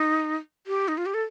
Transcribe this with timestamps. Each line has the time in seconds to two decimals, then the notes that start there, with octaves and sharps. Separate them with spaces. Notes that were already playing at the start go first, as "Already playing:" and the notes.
Already playing: D#4
0.67 G4
0.88 D#4
0.98 F4
1.06 G4
1.14 A4